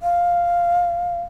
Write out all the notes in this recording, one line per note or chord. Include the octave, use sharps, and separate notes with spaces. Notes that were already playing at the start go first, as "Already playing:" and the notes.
F5